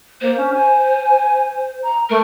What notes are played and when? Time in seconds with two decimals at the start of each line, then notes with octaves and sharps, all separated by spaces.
0.21 A#3 C5
0.37 C#4
0.53 G#5
1.83 A#5
2.10 A3 A#4